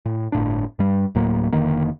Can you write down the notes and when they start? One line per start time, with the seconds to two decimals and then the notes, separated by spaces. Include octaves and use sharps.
0.06 A2
0.32 G1 A2 D4
0.79 G2 G3
1.15 D1 A2 F#3 A#3
1.52 F1 D3 D#3 A#3